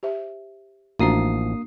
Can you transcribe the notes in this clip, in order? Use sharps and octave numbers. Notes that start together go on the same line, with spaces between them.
G4 C5 E5
A1 F3 A#3 D4 F#4 A#5 D#6 C7